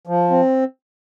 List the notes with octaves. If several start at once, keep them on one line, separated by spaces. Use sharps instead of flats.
F3
C4